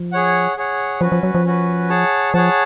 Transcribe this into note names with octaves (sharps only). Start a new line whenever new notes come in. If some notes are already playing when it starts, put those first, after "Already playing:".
Already playing: F3
G#4 C#5 F#5
G#4 C#5 F#5
F3 C#4 F#4 B4
F3
F#3
F3
C#4 F#4 B4
G#4 C#5 F#5 A5
F3 G#4 C#5 F#5 A5